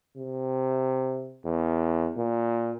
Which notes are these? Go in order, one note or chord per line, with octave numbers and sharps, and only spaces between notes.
C3
E2
A#2